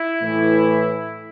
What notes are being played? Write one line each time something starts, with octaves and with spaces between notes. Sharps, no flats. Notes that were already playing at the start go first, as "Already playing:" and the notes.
Already playing: E4
A2 E3